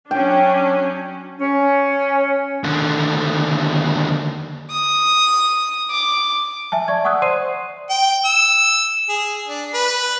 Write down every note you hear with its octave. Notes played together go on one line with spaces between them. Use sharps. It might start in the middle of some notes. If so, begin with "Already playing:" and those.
F#3 C#4 D4 G5
C#4
D#2 D3
D#6
D6
E5 G#5 A5
D5 C#6 G#6
F#5 C#6 D#6 E6 F#6
C5 D5 C6 C7 D#7
G5
E6
G#4
D4
B4